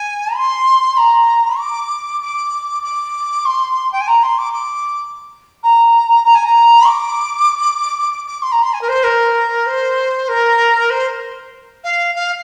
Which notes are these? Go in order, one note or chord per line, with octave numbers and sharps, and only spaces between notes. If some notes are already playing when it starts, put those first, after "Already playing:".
Already playing: G#5
C6
A#5
D6
D6
D6
C6
G5
G#5
A#5
C6
D6
D6
A#5
A#5
G#5
A#5
D6
D6
D6
C6
A#5
C6
G#5
A#4
C5
A#4
C5
A#4
C5
F5
F5